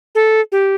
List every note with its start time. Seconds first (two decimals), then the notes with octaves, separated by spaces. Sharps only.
0.15 A4
0.52 G4